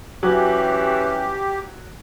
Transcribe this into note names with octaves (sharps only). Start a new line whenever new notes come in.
E3 F#3 C#4 G4